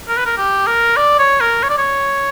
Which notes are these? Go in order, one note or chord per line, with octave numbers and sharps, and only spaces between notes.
A#4
B4
A#4
G4
A#4
D5
C#5
A#4
C#5
D5
C#5